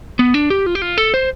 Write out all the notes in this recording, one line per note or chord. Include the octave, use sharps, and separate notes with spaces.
B3
D4
G4
F4
G4
F4
A4
C5